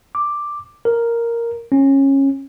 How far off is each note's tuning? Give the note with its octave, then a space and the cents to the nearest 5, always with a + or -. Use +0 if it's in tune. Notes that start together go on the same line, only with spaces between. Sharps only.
D6 +5
A#4 +0
C#4 -20